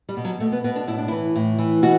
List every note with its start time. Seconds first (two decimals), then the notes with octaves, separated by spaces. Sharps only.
0.09 G3
0.17 B2
0.25 F#3
0.40 B2 A3
0.52 B3
0.64 B2 B3
0.76 D4
0.88 A2 E4
0.98 D4
1.08 E3 E4
1.36 A2
1.59 E3
1.82 B2 F#4